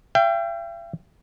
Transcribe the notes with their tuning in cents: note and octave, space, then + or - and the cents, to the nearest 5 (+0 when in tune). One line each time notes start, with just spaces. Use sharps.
E5 +45 G5 +0